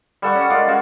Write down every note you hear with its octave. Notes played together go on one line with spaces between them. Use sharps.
G3 A4 F#5 C#6
C#4
G#3 F4 A#4 D5
C#4 F4 F#4 G#4